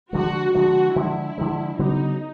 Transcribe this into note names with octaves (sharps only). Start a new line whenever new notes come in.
D3 F3 G#3 F#4
D3 F3 G#3 F#4
D3 F3 G#3 E4
D3 F3 G#3
C#3 F#3 B3 D4 D#4